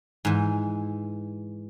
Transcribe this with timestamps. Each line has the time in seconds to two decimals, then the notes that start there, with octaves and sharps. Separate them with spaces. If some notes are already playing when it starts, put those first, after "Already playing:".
0.25 G#2 E3